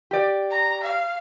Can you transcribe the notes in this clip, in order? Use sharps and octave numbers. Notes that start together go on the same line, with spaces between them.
G4 D5
A#5
F5